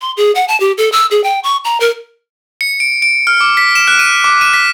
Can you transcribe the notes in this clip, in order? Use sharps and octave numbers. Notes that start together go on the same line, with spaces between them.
C6
G#4
F#5
A5
G4
A4
E6
G#4
G5
C#6
A#5
A#4
C#7
D7
D7
F6
D6
B6
E7
F#6
D#7
D6
D#7
B6